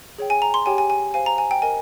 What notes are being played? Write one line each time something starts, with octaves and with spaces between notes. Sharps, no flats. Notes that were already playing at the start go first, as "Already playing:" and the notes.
G#4 C#5 G5
G#5
A#5
C6
G4 C#5 G5 G#5
G#5
G#5
C5 F5 G#5
A#5
G#5
G5
A#4 D#5 G5 G#5